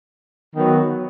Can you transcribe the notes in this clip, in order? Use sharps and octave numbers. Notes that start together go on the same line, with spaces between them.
D#3 F#3 B3